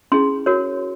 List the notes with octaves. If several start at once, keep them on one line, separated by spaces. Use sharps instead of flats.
C#4 E4 G#4 C6
F#4 A#4 C#5